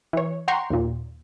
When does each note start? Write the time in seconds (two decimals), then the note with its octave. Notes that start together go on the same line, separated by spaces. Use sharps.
0.13 E3 C#5
0.48 F#5 G5 A#5 C6 C#6
0.70 D#2 A#2